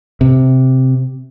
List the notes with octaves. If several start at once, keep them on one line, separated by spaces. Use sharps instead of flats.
C3